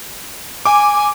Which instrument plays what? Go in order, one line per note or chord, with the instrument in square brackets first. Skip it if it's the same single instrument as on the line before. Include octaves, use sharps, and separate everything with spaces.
[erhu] G#5 [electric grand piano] D6